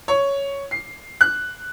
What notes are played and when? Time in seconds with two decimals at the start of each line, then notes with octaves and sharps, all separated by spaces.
0.08 C#5
0.71 C7
1.21 F#6